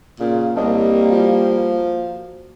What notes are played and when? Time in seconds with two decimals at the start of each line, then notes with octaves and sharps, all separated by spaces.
0.20 A#2 C#3
0.56 C2 G3 A#3 C#5 D#5 A5
1.12 F3 F#4